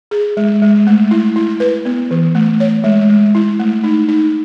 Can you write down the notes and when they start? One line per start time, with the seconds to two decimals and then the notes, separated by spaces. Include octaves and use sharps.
0.11 G#4
0.37 G#3
0.62 G#3
0.87 A3
1.11 E4
1.36 E4
1.60 B4
1.85 B3
2.11 E3
2.35 A3
2.60 C#5
2.84 G#3
3.10 G#3
3.35 E4
3.60 A3
3.84 D#4
4.09 D#4